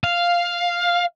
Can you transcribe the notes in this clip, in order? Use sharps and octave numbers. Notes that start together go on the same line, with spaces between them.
F5